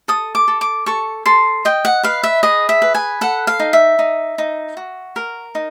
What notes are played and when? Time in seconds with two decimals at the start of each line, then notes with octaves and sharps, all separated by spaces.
0.08 A4 D#6
0.35 D6
0.48 A4
0.61 D6
0.86 A4 C#6
1.26 A4 C6
1.65 D#5 G5
1.85 F#5
2.03 B4 F5
2.23 E5
2.43 G#4 D#5
2.69 E5
2.82 B4
2.95 G#5
3.21 A4 F#5
3.47 F5
3.60 D#4
3.73 E5
3.99 D#4
4.38 D#4
4.77 F#4
5.16 A#4
5.55 D#4